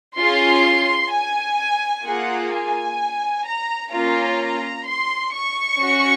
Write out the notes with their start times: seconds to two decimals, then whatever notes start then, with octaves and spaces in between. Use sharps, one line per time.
0.18 C#4 F4 G#4 C6
1.12 G#5
2.05 A#3 F4 G#4 F#5
2.53 G#5
3.46 A#5
3.92 A#3 C#4 F4 A#5
4.86 C6
5.33 C#6
5.79 C#4 F#4